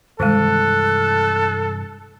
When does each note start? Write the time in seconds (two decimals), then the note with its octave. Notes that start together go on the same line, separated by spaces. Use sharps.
0.20 G2 C3 D#3 E3 G#3 A4 F#6